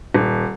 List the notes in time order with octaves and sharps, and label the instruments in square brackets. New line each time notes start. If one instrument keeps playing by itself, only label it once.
[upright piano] D#1